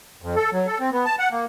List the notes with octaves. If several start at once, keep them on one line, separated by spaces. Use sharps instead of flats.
F2
A4
F#3
A4
C4
B3
A5
F#5
A#3